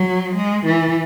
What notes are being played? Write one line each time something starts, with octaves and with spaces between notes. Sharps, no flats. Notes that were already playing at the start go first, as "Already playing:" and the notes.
Already playing: F#3
G#3
E3